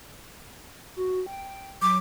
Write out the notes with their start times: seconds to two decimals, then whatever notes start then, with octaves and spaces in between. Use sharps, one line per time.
0.96 F#4
1.26 G5
1.82 F#3 D6